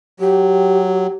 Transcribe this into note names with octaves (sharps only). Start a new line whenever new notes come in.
F#3 G4